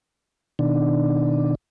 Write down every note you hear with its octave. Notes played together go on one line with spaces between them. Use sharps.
B2 D#3 D4